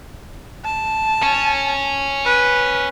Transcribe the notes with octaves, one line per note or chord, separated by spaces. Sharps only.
A5
C#4
B4